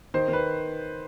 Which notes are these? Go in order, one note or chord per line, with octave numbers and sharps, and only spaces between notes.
D#3 C5
D#3 B4